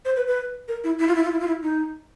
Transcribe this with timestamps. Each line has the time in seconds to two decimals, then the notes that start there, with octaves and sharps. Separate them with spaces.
0.05 C5
0.16 B4
0.27 B4
0.68 A#4
0.84 E4
0.99 E4
1.08 F4
1.15 E4
1.24 F4
1.32 E4
1.40 F4
1.47 E4
1.62 D#4